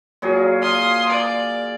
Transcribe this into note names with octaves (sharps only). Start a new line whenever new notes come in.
A#2 F#3 G#4
F5 C6 D#6
D5